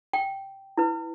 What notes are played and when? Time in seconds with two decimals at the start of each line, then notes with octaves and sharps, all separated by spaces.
0.13 G5
0.77 E4 B4